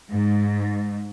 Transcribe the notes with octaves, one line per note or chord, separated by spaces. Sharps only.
G#2